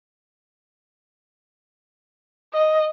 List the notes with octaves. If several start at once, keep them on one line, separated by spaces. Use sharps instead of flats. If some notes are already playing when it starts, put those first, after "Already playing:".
D#5